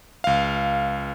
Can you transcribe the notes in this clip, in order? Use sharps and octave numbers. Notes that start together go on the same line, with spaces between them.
C#2 F5